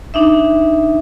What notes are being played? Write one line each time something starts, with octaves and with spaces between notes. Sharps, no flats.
D4 D#4 E5